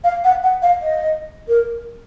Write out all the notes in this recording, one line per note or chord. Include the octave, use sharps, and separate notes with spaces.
F5
F#5
F#5
F5
D#5
A#4